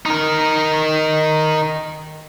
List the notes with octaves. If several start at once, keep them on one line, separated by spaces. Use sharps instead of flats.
D#4 A#4